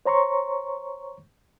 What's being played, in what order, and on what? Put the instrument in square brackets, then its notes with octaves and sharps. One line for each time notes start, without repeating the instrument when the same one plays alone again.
[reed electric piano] C5 C#5 A#5 C6 C#6